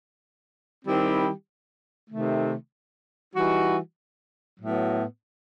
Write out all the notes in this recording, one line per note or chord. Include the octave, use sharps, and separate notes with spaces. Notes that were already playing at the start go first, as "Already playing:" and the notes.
D#3 G3 C4 E4 G4
C3 D#3 A3
E3 G3 D#4 F#4
A2 F#3 B3